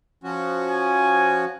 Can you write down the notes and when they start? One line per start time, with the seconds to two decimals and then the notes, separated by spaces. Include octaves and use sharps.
0.24 F3 C#4 F#4
0.69 G#5